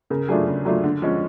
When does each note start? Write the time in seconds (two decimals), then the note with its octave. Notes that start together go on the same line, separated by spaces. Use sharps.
0.10 C#3 A#4
0.28 F#3 A3 D4 F4 G#4
0.47 C#3
0.65 F#3 A3 D4 F4
0.84 D3
1.02 F3 G#3 C#4